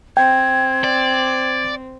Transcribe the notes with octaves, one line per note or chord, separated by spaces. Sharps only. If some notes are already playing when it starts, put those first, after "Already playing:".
C4 G5 G#6
D5